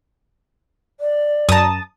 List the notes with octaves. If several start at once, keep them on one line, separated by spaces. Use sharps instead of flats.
D5
F#2 A5 A#5 D#6